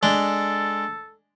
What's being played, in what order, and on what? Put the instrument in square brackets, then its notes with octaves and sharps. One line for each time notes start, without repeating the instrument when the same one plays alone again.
[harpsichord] G#3 D4 [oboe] A4